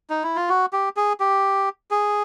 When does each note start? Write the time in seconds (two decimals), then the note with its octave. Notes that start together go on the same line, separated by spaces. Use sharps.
0.10 D#4
0.23 E4
0.36 F4
0.49 F#4
0.73 G4
0.97 G#4
1.20 G4
1.91 G#4